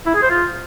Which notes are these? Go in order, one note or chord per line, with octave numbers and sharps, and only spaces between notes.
E4
G#4
C5
F4